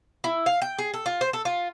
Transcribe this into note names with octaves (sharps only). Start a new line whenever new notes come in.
E4
F5
G5
G#4
A4
F4
C5
A4
F4